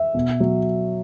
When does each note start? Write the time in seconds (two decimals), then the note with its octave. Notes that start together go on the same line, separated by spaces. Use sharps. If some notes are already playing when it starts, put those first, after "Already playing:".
Already playing: E5
0.14 B2
0.40 F#3